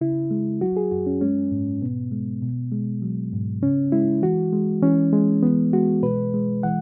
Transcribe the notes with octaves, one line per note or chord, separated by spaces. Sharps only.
C#3 E4
G#3
F#3 F#4
G#4
F#2 F#4
C#4
G#3 C#4
G#2
B2 B3
G#3
B2
G#3
F#3
G#2
C#3 C#4
G#3 E4
E3 F#4
G#3
E3 C#4
G#3
E3 B3
G#3 F#4
B2 B4
G#3
E3 F#5